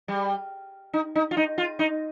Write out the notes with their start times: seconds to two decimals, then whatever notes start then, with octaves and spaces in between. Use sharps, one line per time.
0.08 G3
0.93 D#4
1.15 D#4
1.31 F4
1.37 D#4
1.58 F4
1.79 D#4